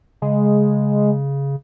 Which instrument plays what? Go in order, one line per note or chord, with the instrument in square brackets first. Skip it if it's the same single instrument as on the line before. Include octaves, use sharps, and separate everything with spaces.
[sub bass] C#3 [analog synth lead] G#3